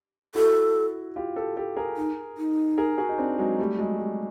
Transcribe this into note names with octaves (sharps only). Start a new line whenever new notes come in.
E4 F#4 A4
F4 G4
G4 A4
G4 A4
G#4 A#4
D#4
D#4
G#4 A#4
F#4 G#4
D#4
C4 D4
F#3 G#3
G3 A3
F#3 G#3
G3